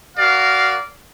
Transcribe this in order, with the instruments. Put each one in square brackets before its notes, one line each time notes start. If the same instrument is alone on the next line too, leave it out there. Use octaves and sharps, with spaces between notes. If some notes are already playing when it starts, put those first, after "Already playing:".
[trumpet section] F#4 A#4 D5 F5